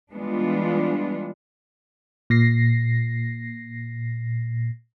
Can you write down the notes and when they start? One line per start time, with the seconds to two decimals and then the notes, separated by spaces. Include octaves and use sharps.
0.13 E3 G3 G#3 B3 D4 F4
2.30 A#2 A#6 C7